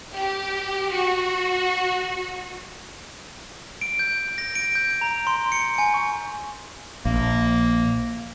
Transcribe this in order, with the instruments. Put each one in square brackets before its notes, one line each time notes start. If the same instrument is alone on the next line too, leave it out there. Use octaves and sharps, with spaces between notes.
[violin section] G4
F#4
[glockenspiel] D7
G6
A#6
D7
G6
A#5
C6
C#7
G#5
C#6
[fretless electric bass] A#1 [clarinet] A#3